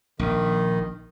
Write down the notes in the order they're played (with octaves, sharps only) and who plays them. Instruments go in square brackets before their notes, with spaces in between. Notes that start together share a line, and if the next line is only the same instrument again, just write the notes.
[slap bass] A#1 [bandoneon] D#3